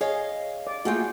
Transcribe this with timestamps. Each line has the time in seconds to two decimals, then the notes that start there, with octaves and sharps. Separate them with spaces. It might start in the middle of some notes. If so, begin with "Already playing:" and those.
0.01 G#4 C#5 D#5 F5
0.67 D5
0.85 A3 A#3 F4 F#4 G#4 G5